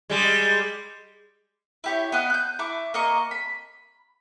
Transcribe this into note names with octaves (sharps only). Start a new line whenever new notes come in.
G3 G#3
E4 G4 C#5
B3 D#5 F5 F#6
F#6 G6
E4 C#6 D6
A#3 D#5 A#5 C#6
B5